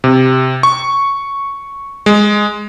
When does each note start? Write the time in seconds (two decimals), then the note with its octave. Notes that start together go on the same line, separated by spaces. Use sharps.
0.04 C3
0.63 C#6
2.06 G#3